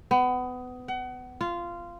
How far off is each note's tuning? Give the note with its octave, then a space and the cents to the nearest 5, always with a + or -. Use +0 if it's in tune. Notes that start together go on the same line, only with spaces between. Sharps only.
B3 +25
F#5 +30
F4 -15